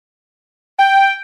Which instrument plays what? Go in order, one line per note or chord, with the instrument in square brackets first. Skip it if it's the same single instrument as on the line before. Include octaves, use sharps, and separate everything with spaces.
[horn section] G5